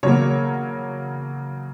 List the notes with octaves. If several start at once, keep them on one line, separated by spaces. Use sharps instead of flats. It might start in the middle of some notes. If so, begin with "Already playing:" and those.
C#3 F#3 A#3 C#5